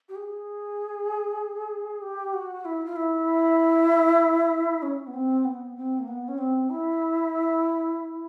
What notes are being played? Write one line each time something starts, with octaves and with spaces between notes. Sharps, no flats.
G4
G#4
G4
F#4
E4
F4
E4
C#4
B3
C4
B3
C4
A#3
B3
C#4
C4
E4